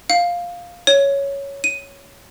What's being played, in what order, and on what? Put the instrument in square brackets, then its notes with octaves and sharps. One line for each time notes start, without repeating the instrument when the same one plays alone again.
[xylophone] F5
C#5
D#7